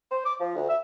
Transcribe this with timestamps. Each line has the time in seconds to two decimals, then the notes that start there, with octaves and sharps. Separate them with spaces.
0.12 C5
0.25 D6
0.40 F3
0.55 D2
0.69 E5